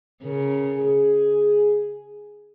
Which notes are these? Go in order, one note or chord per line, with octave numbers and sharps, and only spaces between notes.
C#3 A#4
G#4